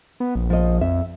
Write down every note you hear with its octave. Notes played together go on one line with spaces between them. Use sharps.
B3
A#1
F3 D#5
F2 E5